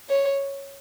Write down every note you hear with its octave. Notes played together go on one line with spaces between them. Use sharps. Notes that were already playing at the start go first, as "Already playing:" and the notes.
C#5